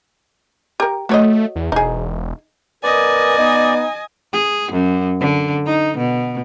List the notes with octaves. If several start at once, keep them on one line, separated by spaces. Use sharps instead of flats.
G4 A#4
A3 F#4 C#5 D#5
E2
E1 D#4 G#4
B3 A#4 D5 D#5 G#5
B3 D#4
G#4
F#2
D3
D#4
B2